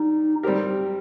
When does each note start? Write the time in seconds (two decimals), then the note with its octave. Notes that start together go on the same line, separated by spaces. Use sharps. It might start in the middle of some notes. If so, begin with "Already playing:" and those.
Already playing: G3 D#4
0.43 G3 C4 G4 A#4